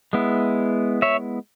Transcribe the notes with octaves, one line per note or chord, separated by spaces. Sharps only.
G#3 B3 E4
C#5 E5